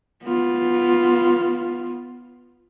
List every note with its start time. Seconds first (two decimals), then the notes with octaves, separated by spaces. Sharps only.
0.24 B3 F4